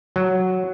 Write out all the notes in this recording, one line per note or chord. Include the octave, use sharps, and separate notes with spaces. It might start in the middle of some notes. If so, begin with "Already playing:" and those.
F#3